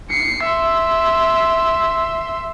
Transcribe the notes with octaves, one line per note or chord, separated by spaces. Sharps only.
C7 C#7
E5 C6